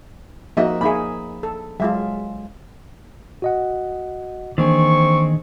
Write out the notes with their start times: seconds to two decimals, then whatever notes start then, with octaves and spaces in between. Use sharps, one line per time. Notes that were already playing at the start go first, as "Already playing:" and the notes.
0.57 F3 A#3 D#4 F#4 D#5 E5
0.81 A#3 D#4 G#4 E5 B5
1.43 A4
1.80 F#3 G#3 F4 E5
3.42 F#4 D#5 F#5
4.58 D#3 E3 A#3 C4 D4 G#4 C#6